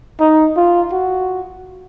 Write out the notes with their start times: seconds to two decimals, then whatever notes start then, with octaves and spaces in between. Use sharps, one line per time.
0.20 D#4
0.57 F4
0.92 F#4